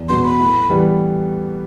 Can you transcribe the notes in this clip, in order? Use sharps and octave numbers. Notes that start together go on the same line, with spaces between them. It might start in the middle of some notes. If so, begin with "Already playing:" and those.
Already playing: E2
B2 F#3 B3 C6
B5
A2
E3 G3 B3